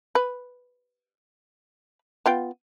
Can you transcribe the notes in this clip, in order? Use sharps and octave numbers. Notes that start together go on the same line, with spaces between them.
B4
B3 F4 G5